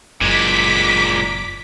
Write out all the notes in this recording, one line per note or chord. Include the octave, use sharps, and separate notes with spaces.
F#1 A#2 G#3 D6 B6